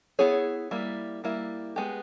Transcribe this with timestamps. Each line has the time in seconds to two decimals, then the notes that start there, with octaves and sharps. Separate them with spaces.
0.19 B3 E4 G#4 C#5
0.71 G3 A#3 E4
1.24 G3 A#3 E4
1.76 G#3 B3 G4